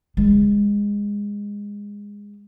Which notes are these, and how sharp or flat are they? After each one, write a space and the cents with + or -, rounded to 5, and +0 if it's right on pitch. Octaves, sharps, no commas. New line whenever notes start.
G#3 -20